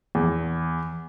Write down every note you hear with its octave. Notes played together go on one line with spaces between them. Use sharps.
E2